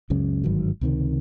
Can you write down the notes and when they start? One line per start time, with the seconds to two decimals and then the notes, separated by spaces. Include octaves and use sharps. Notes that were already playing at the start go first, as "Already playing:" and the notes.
0.10 C#2 F#2 C#3
0.44 G1 G#2 D#3 F#3
0.81 C#2 C3 D#3